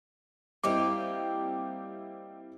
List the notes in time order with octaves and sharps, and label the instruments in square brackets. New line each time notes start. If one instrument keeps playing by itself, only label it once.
[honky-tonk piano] G3 C4 E4 [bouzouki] A#3 D#4 G4 [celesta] D6